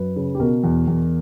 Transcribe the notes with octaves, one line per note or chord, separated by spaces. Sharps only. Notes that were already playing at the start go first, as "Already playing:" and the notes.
Already playing: F#2 B4
C#3
G4
B2 A#4
E2
E2